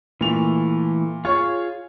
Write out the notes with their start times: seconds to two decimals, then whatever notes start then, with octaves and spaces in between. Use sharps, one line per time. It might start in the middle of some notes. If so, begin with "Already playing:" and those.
0.21 A#2 E3 A3 F7
1.25 F4 G#4 C#5 F5 C#6